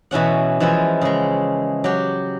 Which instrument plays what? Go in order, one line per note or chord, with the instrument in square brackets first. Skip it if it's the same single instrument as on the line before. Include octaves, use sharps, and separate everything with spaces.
[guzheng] B2 E3 C#4 F#5
E3 F3 G#3 E4
C#3 G#3
F#3 G4